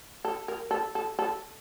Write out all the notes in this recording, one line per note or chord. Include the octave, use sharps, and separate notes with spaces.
A4
A#4
A4
A4
A4